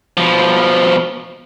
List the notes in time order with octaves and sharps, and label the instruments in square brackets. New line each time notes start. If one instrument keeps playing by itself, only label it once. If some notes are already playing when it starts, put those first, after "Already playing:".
[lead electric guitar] B2 F3